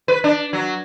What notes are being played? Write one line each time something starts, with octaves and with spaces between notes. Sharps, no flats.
B4
D4
F#3